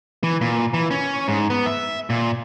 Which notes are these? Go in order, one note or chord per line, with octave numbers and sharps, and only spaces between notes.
E3
A#2
E3
C#4
G#2
B3
E5
A#2